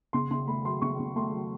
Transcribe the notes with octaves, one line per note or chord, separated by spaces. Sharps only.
C#3 C6
C#3 C6
A3 B5
F#3 C6
C#3 C#6
C#3
A3 C6
F#3